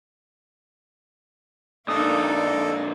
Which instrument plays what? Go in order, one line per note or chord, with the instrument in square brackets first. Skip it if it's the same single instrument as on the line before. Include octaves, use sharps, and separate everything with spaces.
[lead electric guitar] A#2 D3 [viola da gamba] A#3 D#4 [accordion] A4 D5 D#5 [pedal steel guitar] D#6